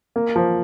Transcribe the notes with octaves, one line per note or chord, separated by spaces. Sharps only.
A#3
F3